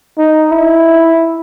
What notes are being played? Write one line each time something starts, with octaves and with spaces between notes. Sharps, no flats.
D#4
E4